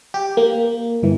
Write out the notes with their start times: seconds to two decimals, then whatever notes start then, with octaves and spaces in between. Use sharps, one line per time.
0.14 G4
0.37 A#3
1.02 G1 E3